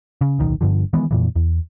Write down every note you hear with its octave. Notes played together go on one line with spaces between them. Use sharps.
C#3
D1 B1 D#3
G1 G2 D3 F3
D#3 E3 G#3 B3
F2 A#2 E3
E2